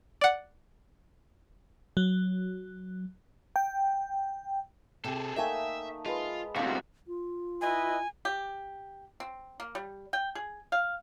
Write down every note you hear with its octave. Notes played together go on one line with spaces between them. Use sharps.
D5 F#5
F#3
G5
C3 G#4 A4
A3 A#3 D#4 D#5 E5 G5 G#5
G#3 F4 B4
D2 C3 F#4 F5
F4
E4 B4 D#5 G#5
G4
C4
A#3
G3
G5
G#4
F5